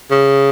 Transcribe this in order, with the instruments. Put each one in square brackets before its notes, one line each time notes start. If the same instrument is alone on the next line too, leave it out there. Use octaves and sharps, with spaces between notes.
[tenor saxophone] C#3